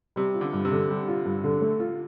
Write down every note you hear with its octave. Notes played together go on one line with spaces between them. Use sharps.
C3 G3
F4
D3
G2
C3
D3
G3
F4
G2
D3
A3
F4